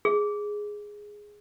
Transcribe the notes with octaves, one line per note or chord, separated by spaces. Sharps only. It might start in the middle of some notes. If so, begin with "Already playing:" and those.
G#4